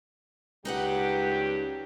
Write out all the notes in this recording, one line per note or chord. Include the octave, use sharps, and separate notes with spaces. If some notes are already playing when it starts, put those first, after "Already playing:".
C#2 G2 F#3 D#4 G4 B4 F#5